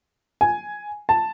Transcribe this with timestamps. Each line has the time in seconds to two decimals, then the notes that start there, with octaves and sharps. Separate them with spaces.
0.41 G#5
1.09 A5